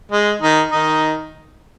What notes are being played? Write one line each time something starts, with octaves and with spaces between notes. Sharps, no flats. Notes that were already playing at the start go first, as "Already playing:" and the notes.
G#3
D#3 D#4
D#3 D#4